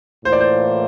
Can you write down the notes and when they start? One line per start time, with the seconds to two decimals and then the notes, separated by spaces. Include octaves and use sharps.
0.25 A2 E3 A#3 F4 C5
0.33 D5
0.40 C5